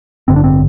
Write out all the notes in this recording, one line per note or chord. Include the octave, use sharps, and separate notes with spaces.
A1 G2 D3 C4
D4
C4